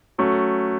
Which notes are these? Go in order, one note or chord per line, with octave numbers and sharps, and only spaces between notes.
F#3 A3 C#4 F#4